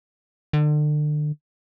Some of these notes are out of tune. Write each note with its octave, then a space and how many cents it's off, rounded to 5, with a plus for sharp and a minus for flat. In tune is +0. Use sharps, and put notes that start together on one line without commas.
D3 +35